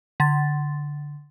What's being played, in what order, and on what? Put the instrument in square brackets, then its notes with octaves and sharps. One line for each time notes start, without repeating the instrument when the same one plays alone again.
[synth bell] D3 A6